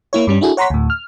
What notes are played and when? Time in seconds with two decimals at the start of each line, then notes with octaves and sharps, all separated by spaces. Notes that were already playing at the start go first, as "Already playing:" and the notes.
0.13 A#3 E4 C#5
0.27 G2 G3 C#4
0.41 D4 E4 F#4 G#4 A4
0.57 C#5 F#5 A#5 C6 C#6 B6
0.70 D2 A2
0.90 F6